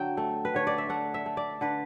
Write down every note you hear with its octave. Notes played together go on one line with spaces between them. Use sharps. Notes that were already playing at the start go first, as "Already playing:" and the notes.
Already playing: D3 F#3 G5
A3
B4
D3 C#5
D5
E5
A3 F#5
E5
A3
D5
D3 B4